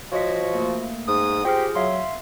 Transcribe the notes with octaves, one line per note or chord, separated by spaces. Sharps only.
F3 F#4 C#5 D#5 B6
A3 A#3
G#2 D#6
F4 G4 G#4 C5 G5 F6
F#3 E5 F5 C6